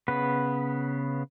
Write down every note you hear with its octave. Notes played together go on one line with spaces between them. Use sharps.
C#3 B3 B4